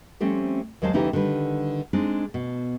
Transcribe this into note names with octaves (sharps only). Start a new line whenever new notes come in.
F3 G3 A3 C4 C#4
D#2 F#3 G#3 C5 F5 A5
D2 C#3 E3 D#4 E4 G4
D3 D#3 G3 B4
G#3 C4 D4 D#4
B2